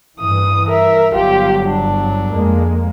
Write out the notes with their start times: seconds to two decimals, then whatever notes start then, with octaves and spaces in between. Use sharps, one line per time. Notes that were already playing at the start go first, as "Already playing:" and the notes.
0.20 G2 E3 D#6
0.67 A#4 E5
1.15 G1 F#3 F4 G4
1.66 D4
2.33 F2 G#3 A#3